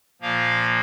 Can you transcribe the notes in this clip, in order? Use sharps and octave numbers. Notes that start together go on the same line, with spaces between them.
A#2 F3 A#3 F5